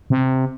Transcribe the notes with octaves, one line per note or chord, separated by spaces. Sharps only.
C3